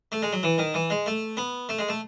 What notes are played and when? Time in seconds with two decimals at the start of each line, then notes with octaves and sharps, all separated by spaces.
0.12 A3
0.22 G#3
0.33 F#3
0.43 E3
0.58 D#3
0.74 E3
0.90 G#3
1.06 A3
1.37 B3
1.69 A3
1.79 G#3
1.88 A3